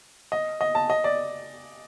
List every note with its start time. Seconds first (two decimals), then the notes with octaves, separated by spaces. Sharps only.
0.32 D#5
0.61 D#5
0.75 A5
0.90 D#5
1.04 D5